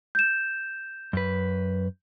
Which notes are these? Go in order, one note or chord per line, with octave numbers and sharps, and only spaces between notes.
G6 E7
F#2 B4